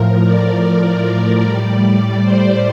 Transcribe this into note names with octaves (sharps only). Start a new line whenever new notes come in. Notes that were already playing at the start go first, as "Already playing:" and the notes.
Already playing: A2 F3 A#4
D5
A2 G3
C5